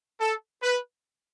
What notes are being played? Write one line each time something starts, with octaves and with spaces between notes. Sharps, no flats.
A4
B4